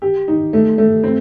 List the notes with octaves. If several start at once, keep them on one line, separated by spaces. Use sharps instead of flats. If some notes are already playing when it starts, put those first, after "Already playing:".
G4
D#4
A3
A3
C4